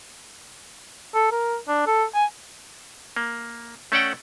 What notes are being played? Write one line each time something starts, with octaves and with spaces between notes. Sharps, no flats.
A4
A#4
D4
A4
G#5
A#3
A3 C#4 A4 D5 F#5 G5